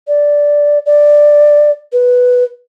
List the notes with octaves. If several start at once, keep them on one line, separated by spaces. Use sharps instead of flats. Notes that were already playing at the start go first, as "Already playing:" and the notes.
D5
D5
B4